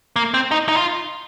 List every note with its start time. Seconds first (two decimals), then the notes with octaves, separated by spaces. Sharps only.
0.16 A#3
0.34 C4
0.51 D#4
0.68 D#4
0.77 F4